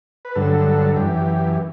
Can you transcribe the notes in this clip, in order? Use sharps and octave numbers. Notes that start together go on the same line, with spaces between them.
B4
G2 D3 F#3 A4
F#2 E3 G4